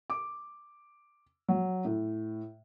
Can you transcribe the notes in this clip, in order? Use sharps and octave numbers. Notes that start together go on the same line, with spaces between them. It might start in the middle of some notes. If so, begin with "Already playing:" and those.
D6
F#3
A2